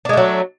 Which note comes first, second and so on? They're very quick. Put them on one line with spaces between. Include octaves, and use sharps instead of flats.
D4 G#3 A3 F#3